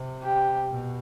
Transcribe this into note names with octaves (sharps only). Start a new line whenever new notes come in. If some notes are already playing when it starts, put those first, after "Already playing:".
Already playing: C3
G4
B2